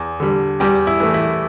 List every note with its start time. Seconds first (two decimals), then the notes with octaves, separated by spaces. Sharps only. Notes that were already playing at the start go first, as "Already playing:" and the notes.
Already playing: E2
0.20 D3 G3
0.60 E2 G3 G4
0.87 E4
1.00 E3 A3
1.14 E4